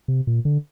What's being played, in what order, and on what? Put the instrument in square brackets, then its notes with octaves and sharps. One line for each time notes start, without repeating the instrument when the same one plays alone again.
[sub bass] C3
A#2
D3